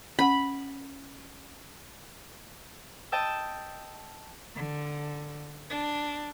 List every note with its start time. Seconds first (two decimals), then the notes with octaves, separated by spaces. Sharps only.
0.19 C#4 F#5 B5
3.12 D#5 G5 A5 E6
4.55 D3
5.68 D4